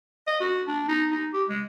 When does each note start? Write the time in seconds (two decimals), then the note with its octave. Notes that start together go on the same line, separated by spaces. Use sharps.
0.27 D#5
0.41 F#4
0.67 D4
0.88 D#4
1.11 D#4
1.33 G4
1.48 G#3